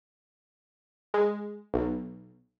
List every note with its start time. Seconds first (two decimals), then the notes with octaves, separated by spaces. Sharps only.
1.14 G#3
1.74 B1